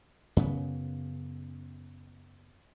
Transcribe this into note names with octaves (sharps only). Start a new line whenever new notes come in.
F#2 C#3 B3